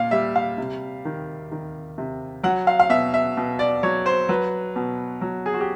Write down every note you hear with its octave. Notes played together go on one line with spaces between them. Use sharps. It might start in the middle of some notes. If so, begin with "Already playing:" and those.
Already playing: A#2 F5
G3 E5
F5
C3
D#3
D#3
C3
F#3 F#5
F5
F5
B2 E5
E5
B2
D5
F#3 C#5
C5
F#3 B4
B2
F#3
G#4
F#4
G4